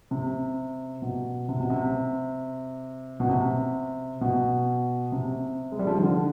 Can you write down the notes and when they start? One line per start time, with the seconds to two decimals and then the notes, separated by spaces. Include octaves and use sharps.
0.11 C3
1.02 B2
1.49 C3
1.60 B2
1.70 C3
3.20 B2
3.29 C3
4.21 B2
5.12 C3
5.72 G#3
5.79 G3
5.87 F3
5.95 D#3
6.03 D3